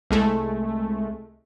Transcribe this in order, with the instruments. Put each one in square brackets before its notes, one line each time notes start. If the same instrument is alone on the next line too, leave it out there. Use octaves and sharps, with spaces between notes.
[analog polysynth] C2 G#3 A3